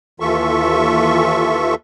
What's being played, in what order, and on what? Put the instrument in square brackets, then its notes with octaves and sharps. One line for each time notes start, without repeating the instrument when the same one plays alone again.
[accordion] D#2 E3 F4 A4 E5 C#6